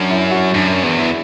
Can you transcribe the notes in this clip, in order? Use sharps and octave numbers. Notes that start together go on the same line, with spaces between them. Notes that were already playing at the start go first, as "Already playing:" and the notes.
Already playing: F#2 C#4 D4
E4
F#4
F#2 D4
E2
E4